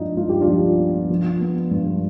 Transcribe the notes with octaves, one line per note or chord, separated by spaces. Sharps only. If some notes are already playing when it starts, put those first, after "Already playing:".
Already playing: G2 F3 B3 D4 D#4 F4
G2 F4
G4
D4 F4
F3
B3
F3
B3
G2